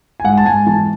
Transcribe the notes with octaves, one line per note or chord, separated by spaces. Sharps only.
G#5
G#2 F#5
A5
G#2 G#5
E3 A5